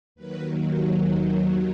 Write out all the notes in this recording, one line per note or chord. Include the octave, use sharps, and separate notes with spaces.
D#2 D#3 F#3 B4